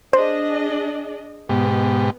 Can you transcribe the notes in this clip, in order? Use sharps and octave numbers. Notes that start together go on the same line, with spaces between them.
D4 G#4 C5 D#5
G#2 B2 B3 G4